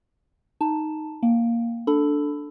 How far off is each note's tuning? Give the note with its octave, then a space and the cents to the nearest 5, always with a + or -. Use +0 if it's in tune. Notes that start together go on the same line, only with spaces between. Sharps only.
D#4 +0 A5 +0
A#3 +0 G5 +0
D4 +0 A4 +0 B5 +15